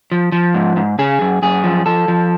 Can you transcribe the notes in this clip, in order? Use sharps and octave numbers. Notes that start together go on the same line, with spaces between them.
F3
F3
G#2
G#2
C#3 G#4
F#2
F#2 G#4
F3
F3 A4
F3